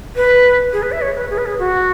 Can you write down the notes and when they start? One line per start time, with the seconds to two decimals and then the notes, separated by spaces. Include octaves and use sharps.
0.16 B4
0.73 G#4
0.82 B4
0.92 E5
1.01 C#5
1.16 B4
1.30 G#4
1.38 B4
1.46 G#4
1.59 F#4